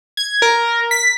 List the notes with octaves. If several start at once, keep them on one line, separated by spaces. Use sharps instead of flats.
G#6
A#4
B6